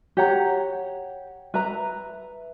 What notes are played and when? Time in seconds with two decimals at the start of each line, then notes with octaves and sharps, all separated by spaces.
0.17 G4 C#5 F#5 A#5
1.54 B4 E5 A#5